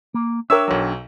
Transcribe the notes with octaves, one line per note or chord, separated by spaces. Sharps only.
A#3
D4 A#4 C#5 E5 G5 E6
B1 F#3